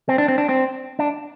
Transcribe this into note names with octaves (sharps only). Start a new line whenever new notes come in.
C4
D4
C4
D4
C4
D4